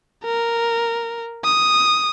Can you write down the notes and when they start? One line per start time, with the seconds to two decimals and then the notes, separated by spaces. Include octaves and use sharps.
0.24 A#4
1.45 D#6